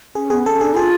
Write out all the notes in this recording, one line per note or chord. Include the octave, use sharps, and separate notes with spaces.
C#4 G#4
B3 G#4
C#4 A4
D4 G#4
F4 G#4